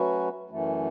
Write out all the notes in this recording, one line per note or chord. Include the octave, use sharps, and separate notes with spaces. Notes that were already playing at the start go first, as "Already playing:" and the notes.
Already playing: F#3 A3 C#4 F#4 B4
F#2 E3 A3